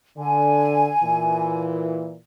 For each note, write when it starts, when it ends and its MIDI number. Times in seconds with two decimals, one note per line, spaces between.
0.17 0.90 50
0.17 1.62 80
1.03 2.15 46
1.03 2.15 52